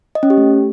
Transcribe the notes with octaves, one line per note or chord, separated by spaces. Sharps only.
D#5
C#4
G4
A3